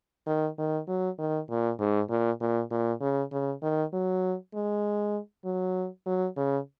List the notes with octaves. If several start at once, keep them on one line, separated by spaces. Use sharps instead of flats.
D#3
D#3
F#3
D#3
A#2
G#2
A#2
A#2
A#2
C#3
C#3
D#3
F#3
G#3
F#3
F#3
C#3